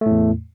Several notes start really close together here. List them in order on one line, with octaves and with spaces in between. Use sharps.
A3 A2 E2